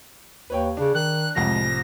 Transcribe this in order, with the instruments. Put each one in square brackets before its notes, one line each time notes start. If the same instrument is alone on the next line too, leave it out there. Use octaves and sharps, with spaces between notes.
[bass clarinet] D#2 [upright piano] B4 C#5 G5
[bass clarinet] C#3 [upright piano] D4
[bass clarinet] D#3 [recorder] F#6
[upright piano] C2 F2 A2 [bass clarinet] G#3 [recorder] A#6